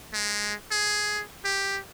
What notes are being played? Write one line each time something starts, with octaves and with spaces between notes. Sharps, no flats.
G#3
G#4
G4